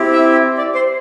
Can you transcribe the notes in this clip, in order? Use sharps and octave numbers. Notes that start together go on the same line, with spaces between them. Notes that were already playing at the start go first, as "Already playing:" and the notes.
Already playing: C4 E4 G4
E5
D5
C5